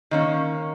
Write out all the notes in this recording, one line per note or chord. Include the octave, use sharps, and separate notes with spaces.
D#3 A#3 C#4